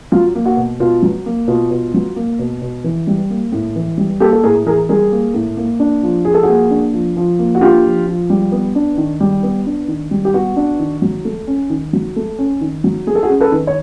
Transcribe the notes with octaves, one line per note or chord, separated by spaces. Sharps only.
F#3 F4
A#3
F#4
B2
B2 F4
F#3
A#3
B2 F4
B2
F#3
A#3
B2
B2
E3
G3
A#3
A2
E3
G3
A#3 G4 A4
A4
A2 G#4 A#4
E3 G#4 A#4
G3 G#4 A#4
A#3
A2
A#3
D4
F3
F3 G#4
A4
F#4 G#4
A#3
D4
F3
F3
A#3
F#4
D4 F4 G4
F3
F3
G3
B3
D4
D#3
G3
B3
D4
D#3
G3
G4
B3 F#4
D4
D#3
F#3
A3
C#4
D#3
F#3
A3
C#4
D#3
F#3
A3 G#4
A4
F#4 G#4
C#4
A4 B4
D#3
C#5